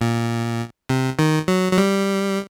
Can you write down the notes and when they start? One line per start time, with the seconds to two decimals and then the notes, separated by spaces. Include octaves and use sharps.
0.01 A#2
0.89 C3
1.19 D#3
1.48 F#3
1.72 F#3
1.78 G3